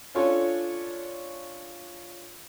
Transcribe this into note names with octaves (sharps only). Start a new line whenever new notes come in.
C#4 D4 F4 A4 C#5